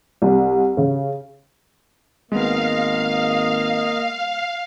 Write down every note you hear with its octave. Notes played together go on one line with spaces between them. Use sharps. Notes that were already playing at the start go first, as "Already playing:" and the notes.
C2
C#3
G#1 G#3 A#3 B3 D#5 F5